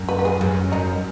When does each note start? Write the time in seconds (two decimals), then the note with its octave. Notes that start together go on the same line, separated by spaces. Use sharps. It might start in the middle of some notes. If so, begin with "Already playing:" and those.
Already playing: F#2
0.09 B4
0.19 B4
0.25 G#4
0.41 F#2
0.72 F#2 D#4